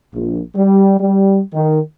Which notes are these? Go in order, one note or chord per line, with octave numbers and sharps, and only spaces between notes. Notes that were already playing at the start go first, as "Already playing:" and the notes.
A#1
G3
G3
D#3